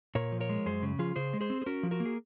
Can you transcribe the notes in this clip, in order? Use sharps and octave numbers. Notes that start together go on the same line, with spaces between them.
A#2 A#4 C#5
F3
A#4 C#5
G#3
F#2 G#4 C5
C#3
F3 F4 G#4
C#3 G#4 C5
G#3
G#4 C5
C4
G#4
C#4 F#4 A#4
F3
F#4 A#4
A#3
G#4